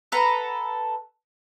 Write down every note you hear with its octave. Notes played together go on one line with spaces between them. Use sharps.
A4 B4 F#5 A#5